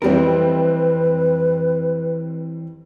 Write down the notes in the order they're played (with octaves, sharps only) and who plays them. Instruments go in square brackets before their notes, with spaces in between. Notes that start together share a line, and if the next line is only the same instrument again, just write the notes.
[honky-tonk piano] F2 G3 C4 [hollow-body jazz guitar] E3 A#4 [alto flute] B4